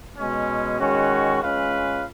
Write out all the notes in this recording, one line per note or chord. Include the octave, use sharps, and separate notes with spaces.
B2 G#3 C#4
D#3 G#3 C#4 F#4
G#3 C#4 F4 B4 F5